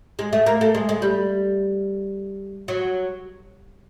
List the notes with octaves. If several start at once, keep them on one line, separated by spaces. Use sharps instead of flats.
G#3
A3
A#3
A3
G#3
G#3
G3
F#3